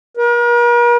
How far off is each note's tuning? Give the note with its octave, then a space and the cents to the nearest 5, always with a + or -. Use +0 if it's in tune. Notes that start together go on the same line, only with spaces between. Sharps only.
A#4 +45